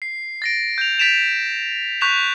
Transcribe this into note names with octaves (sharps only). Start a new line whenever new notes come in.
C7
A6 A#6 D7
G6 F7
G6 A6 B6 D7 E7 F7
C#6 F#6 G6 B6 E7 F7